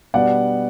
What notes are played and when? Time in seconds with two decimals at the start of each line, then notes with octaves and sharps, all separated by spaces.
0.14 B2 G3 B3 D4 D5 F#5